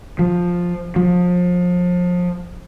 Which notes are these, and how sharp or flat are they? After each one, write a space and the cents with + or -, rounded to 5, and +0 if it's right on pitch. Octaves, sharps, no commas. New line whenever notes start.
F3 +10
F3 +30